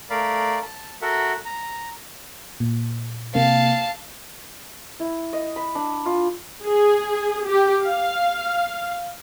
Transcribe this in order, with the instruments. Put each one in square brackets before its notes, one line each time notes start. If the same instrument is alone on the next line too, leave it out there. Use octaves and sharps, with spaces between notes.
[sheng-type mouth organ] A3 A#4 D5 F5 B5
A5
F#4 A4 A#4 E5 F#5
A#5
[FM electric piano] A#2
[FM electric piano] C3 A#3 [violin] F5 A5
[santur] E4
D#5
B5
D4
F4
[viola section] G#4
G4
F5